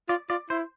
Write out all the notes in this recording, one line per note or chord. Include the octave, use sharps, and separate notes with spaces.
F4 D5
F4 D5
E4 C5